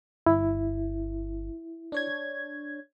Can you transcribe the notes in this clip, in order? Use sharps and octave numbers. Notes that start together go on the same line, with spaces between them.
G1 E4
D4 C#5 G#6